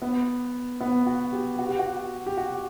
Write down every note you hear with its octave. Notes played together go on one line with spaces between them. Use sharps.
B3
B3
F#4
G4
F#4
G4
F#4
G4
F#4